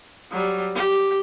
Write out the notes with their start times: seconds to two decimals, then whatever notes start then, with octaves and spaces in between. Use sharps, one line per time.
0.32 F#3 G3
0.75 G4